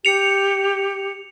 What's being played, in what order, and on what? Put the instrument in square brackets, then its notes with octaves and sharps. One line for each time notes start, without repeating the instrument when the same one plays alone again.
[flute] G4 [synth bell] C#7 F7